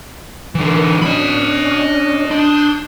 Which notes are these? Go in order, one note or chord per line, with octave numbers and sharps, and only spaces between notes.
D3 E3
A#4
C#4 D4 D#5 B5
D4 C6 D#6 G6